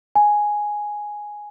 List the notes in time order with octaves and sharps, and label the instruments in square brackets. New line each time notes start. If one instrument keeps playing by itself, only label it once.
[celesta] G#5